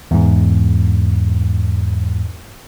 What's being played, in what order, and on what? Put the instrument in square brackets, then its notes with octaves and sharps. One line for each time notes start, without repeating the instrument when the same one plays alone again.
[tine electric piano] E2 G#2